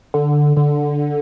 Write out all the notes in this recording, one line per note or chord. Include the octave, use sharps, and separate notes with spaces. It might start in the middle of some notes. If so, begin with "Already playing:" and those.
D3
D3